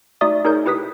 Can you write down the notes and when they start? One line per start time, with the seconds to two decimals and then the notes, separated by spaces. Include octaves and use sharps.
0.21 A3 D#4 F#4 D5 E5 D#6
0.45 D#4 G#4 A#4 C#5 G6
0.66 E4 G4 B4 D#6 B6